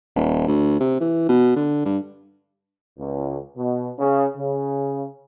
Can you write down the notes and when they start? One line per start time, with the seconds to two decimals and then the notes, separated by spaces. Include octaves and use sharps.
0.16 D#1
0.48 D2
0.80 C3
1.01 E3
1.29 B2
1.56 D3
1.85 G2
2.99 C#2
3.56 B2
3.98 C#3
4.36 C#3